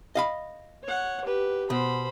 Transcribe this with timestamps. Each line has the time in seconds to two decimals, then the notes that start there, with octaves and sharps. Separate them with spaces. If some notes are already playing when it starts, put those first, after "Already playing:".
0.15 D#5 F5 B5
0.84 C#5 F#5
1.25 G4 B4
1.70 B2 C5 B5